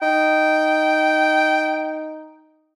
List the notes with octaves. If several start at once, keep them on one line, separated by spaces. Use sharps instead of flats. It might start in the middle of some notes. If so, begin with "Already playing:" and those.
D#4 G5